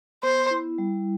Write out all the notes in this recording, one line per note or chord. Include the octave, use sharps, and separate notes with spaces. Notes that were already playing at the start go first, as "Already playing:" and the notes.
B3 C5
E4
G3